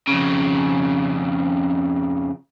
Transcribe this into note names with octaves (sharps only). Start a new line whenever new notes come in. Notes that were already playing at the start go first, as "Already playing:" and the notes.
F2 C#3